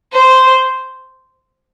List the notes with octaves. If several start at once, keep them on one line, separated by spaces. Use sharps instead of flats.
C5